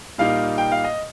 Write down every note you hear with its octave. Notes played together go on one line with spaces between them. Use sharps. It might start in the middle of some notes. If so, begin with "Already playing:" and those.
A#2 G3 A#3 D#4 F5
G5
F5
D#5